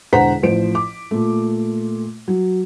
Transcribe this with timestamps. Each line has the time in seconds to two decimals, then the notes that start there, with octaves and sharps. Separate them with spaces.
0.13 E1 D3 C5 F#5 A#5 B6
0.43 A1 F3 C5 D7
0.75 D6
1.11 A#2 A3
2.28 F#3